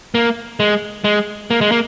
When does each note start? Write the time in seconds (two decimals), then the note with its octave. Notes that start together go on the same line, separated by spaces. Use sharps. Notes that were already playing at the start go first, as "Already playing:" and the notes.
0.15 A#3
0.60 G#3
1.04 G#3
1.50 A#3
1.61 G#3
1.72 A#3